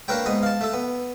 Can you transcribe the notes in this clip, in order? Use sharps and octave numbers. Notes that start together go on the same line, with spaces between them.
A#3 D4 A#4 B4 C#5 G5
G#2 B3 D#5 G#5
F5 A5
A3 A4
B3